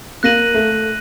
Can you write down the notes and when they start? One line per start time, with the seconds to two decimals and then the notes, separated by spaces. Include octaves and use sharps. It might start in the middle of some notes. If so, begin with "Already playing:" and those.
0.23 A#3 F#6 A#6 D#7 F#7
0.54 A3